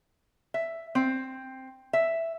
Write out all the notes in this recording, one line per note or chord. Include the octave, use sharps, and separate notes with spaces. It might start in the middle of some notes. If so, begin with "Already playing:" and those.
E5
C4
E5